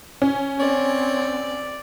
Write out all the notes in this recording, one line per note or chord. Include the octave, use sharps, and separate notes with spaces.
C#4
C4 C#5 D5